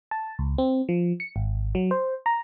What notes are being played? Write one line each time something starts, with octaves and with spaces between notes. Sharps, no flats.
A5
C#2
C4
F3
C#7
G#1
F#3
C5
A#5